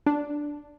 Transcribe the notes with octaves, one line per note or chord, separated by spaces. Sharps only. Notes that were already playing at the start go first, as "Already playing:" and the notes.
D4